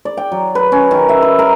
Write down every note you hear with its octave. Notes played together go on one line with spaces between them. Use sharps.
D5
G5
F#3
B4
C#4
D#3
E5
B4
A#4